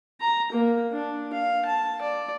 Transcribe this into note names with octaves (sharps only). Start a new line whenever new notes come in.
A#5
A#3
D4
F5
A5
D5